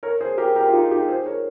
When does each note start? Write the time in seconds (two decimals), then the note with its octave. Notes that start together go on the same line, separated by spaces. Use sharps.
0.03 A#4 C#5
0.21 G#4 C5
0.37 G4 A#4
0.56 G4 A#4
0.69 F4
0.73 D#4 G4
0.90 D#4 G4
1.08 G#4 C5
1.26 A#4 C#5